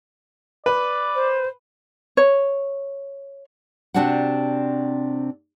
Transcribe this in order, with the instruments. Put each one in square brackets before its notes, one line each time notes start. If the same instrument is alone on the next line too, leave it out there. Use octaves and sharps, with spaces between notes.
[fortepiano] B4 [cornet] D5
[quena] C5
[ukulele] C#5
[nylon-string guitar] C3 C4 D4 F#4 D5 F#5